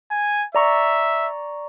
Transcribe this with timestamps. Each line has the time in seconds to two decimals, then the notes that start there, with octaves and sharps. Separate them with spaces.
0.11 G#5
0.55 D5 E5 A#5 C#6